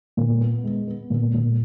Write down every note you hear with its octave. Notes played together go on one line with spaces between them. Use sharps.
A#2
B3
G#3
B3
A#2
A#2